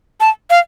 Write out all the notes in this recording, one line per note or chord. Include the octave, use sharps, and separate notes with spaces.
A5
F5